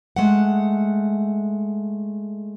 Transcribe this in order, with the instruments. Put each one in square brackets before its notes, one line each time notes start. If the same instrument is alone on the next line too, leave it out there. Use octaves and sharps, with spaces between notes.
[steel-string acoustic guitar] G#3 A3 F#5